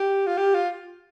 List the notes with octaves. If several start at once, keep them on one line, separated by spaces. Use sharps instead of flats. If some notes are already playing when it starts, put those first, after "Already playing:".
Already playing: G4
F4
G4
F4